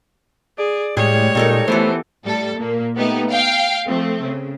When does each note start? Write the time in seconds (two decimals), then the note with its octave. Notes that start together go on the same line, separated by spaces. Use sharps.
0.58 G#4 D5
0.97 A2 G3 G#3 G#4 C#5
1.35 A#2 G3 D#4 A4 A#4
1.68 E3 A3 B3 G4 A4 C5
2.24 A2 G3 A4
2.57 A#2 A#3
2.97 A3 B3 D#4 G4
3.29 F5 G5
3.87 F3 A3 C4
4.23 C#3